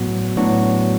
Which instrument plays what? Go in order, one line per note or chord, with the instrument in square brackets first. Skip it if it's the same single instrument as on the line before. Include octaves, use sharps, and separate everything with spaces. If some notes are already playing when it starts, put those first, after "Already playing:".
Already playing: [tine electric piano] A2 F#3 B3 F#4
A2 F#3 B3 D4 F#4